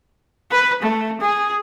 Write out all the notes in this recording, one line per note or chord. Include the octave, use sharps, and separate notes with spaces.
B4
A3
G#4